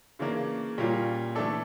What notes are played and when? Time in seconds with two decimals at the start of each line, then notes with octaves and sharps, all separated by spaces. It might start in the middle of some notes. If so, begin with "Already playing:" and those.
0.19 C#3 E3 A#3 D4
0.78 A#2 G3 C#4 F4
1.35 E3 A3 D4 A4 D5